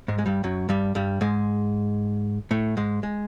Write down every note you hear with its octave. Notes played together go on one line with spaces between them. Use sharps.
G#2 G#3
G#3
G2 G3
F#2 F#3
G2 G3
G2 G3
G#2 G#3
A2 A3
G#2 G#3
G#3